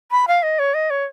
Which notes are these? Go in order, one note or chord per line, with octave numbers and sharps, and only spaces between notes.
B5
F5
D#5
C#5
D#5
C#5